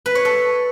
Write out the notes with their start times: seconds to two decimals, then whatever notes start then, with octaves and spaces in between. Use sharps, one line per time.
0.06 B4
0.15 C#5
0.25 A4